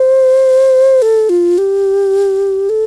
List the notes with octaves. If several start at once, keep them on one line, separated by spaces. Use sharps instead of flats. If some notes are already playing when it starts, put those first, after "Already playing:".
Already playing: C5
A4
F4
G4
A4